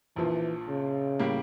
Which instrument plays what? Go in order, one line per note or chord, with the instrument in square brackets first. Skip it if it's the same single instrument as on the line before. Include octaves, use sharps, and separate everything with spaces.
[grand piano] A#1 A#2 F3 [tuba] E3
[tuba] C#3
[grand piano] A2 G3 A#3